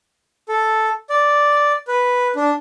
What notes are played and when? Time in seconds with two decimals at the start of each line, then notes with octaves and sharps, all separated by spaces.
0.49 A4
1.10 D5
1.88 B4
2.36 D4